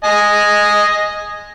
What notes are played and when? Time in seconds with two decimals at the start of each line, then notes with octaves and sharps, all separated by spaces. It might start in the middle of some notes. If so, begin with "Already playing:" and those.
0.04 D#5 G#5